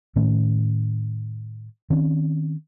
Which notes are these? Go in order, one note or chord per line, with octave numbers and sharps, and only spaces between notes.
A2 D#3 A3 C#4
D#3 C4 C#4